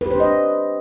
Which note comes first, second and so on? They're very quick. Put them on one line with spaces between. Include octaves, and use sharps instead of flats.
B4 G4 C5 D4 D#5